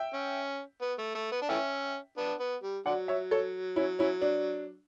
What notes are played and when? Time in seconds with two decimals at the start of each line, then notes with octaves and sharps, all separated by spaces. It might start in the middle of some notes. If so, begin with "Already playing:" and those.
Already playing: E5 G5
0.14 C#4
0.81 B3
0.99 A3
1.15 A3
1.32 B3
1.42 D4
1.49 E3 A3 C#4 E5 G5
2.17 B3 D4
2.40 B3
2.63 G3
2.86 D3 F#3 D5 F#5
3.08 C#5 E5
3.31 A4 C#5
3.76 C#4 E4
3.99 C#4 E4
4.22 D4